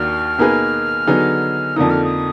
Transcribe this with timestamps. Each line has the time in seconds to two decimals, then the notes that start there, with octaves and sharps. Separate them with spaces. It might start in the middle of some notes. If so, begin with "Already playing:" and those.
Already playing: D#2 D#3 A#3 D4 F#4 F6
0.38 B2 A#3 D#4 G#4 B4
1.07 D3 F#3 B3 D#4 G#4
1.76 F2 D3 F3 A#3 D#4 D#6
1.91 F6
2.04 D#6